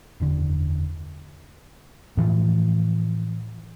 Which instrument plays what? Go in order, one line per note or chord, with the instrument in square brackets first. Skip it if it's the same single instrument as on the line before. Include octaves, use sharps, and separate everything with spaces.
[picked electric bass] F#1 E2 D3
[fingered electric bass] A2 E3 F3